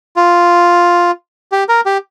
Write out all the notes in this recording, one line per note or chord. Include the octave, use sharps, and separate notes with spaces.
F4
G4
A#4
G4